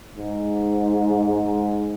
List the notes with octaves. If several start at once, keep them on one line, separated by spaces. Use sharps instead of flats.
G#2
G#2